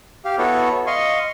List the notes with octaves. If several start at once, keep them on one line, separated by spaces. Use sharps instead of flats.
G4 F5
B3 E4 F#4 A4 C#5
D#5 F5 C6 C#6